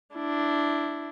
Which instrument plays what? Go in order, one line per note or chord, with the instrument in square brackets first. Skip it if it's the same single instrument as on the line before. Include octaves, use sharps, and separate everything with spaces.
[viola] D4 E4